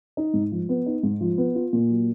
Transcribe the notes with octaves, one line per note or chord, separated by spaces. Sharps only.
D#4
G#2
F3
B3
D#4
G#2
F3
B3
F4
A#2
F#3